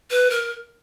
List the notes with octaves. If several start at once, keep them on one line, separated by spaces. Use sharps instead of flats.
B4
A#4